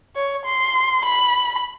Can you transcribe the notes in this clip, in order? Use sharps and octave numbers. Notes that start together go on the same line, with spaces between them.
C#5
C6
B5